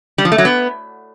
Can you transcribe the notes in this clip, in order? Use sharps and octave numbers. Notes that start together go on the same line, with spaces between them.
G3
F3
A3
F#3
B3